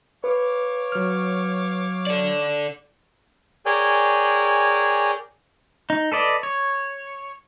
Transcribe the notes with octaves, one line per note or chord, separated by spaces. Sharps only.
B4 C#5 F5 D6
F#3 F6
A4 D5
G#4 A#4 C#5 D5 G5 G#5
D#4
A4 B4 D5 D#5
C#5